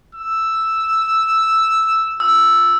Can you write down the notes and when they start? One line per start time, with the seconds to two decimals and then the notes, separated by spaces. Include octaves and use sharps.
0.15 E6
2.20 F4 E6